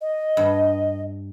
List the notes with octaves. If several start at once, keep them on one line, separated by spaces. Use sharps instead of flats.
D#5
G2